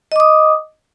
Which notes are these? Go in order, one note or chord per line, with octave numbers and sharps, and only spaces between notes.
D#5 D6 D#6